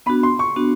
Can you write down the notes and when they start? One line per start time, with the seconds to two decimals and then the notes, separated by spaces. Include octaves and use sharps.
0.06 B3 D4 F#4 B5
0.23 C6
0.39 C#6
0.56 B3 D4 F#4